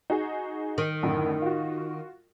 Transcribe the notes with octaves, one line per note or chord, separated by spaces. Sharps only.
D#4 F#4 G#4
D#3
F#2 A2 D3
F4 F#4